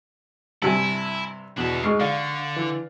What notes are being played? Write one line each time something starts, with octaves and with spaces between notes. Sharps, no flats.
G2 C3 E4 G#5 A5 E6
E2 B2 D4 E5
G#2 G#3 C#6 F6 C7
D3 D5 F5
E3